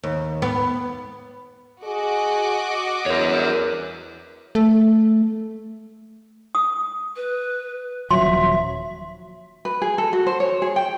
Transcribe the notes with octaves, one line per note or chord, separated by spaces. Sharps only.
D#2
B3
F#4 G#4 D#5 D6
E2 A#4 C#5
A3
D#6
B4
D#1 F3 F#3 E5 C6
B4
G#4
A4
F#4
C5
C#5
G#4
G5